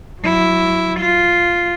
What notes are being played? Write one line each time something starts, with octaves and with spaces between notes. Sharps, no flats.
F#3 E4
F4